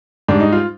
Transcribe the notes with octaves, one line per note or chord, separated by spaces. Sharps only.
G#2 G3 D4
D#4
F4